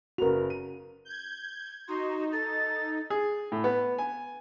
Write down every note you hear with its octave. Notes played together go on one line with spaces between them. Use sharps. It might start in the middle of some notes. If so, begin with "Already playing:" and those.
F#1 F#4 A#4 B4 F7
D#7
G6 G#6
D#4 F#4 C6
A4 A6
G#4
A2
B3
G#5